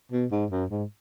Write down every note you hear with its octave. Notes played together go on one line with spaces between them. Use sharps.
B2
G#2
F#2
G#2